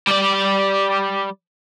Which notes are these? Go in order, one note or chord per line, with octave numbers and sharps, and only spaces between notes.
G3 D5